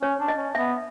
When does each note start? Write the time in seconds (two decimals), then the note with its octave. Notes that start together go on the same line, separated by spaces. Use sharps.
0.02 C#4 C#5
0.20 D4
0.28 D#5
0.37 C#4
0.55 B3 E5